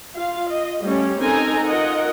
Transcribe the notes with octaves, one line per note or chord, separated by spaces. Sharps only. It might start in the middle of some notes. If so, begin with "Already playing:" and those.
F4 F5
D#5
G3 A3 C#4 G4
C4 D#4 A4 A#4 G#5 A#5
F4 A#4 D#5 F#5